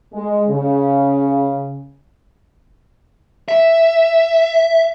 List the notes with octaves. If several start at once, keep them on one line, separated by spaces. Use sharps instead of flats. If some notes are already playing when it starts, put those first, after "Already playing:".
G#3
C#3
E5